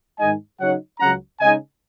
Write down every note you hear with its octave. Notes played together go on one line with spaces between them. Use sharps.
G#2 D#3 G#3 D#4 D#5 G#5
C#3 F#3 D#4 C#5 F#5
C#2 C#3 F#3 C#4 F#5 A#5
C#3 G#3 D#4 D#5 G#5